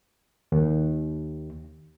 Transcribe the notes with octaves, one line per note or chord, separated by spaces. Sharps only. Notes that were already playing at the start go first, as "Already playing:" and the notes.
D#2